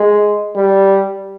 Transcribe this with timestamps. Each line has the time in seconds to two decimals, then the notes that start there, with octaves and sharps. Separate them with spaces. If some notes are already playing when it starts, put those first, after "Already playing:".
Already playing: G#3
0.56 G3